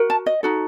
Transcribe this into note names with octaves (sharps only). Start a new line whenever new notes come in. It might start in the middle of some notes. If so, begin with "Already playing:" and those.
Already playing: F#4 A#4
A5
D#5
D#4 F#4 A4